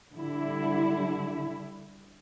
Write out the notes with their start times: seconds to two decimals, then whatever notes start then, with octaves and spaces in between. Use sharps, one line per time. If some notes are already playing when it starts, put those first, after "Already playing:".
0.15 D3 G3 E4